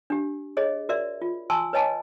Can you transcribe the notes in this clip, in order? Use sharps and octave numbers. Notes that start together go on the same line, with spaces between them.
D4 G4
G#4 C#5 D#5
F#4 A#4 D5 E5
F4
G#5 A5 C6 C#6 E6
B4 C#5 D#5 G#5 A5